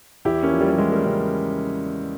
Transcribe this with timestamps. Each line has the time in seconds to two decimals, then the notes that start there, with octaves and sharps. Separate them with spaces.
0.25 E2 E4 G4
0.43 A#3 C#4
0.52 F3
0.61 G3 A#3
0.72 G3
0.78 E2 G#3
0.92 G3 A#3
1.05 C#3 G3